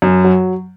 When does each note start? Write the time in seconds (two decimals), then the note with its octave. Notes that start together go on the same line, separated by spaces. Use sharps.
0.02 F#2
0.24 F#3